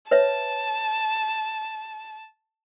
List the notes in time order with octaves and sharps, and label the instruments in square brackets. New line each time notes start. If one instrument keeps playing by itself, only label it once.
[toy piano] B4 C#5 E5 [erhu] A5